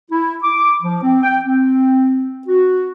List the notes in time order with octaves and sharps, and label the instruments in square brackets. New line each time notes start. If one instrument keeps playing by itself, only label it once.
[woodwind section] E4
D6
F3
C4
G5
C4
F#4